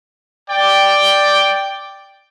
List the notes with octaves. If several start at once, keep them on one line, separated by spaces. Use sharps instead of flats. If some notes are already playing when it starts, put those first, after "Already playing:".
D5 G5